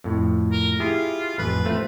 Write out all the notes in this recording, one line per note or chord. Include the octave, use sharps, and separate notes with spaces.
F2 A2
A#4
E4 F4 G4 G#4
A1 F2 B4
A3 C4 F4